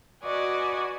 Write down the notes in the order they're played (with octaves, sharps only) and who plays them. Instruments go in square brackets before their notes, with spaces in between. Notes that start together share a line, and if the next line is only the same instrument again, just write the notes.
[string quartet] F#4 B4 D5 D#5 G#5